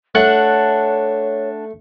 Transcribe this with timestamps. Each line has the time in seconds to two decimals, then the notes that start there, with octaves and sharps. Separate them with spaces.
0.15 A3 D4 C#5 F#5 F#6